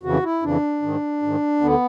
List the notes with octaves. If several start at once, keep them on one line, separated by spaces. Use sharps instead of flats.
F2 C#3 E3 F#4
E4
F2 C#3 E3 D4
G#2 D#3
G#2 D#3
D2 D3 B3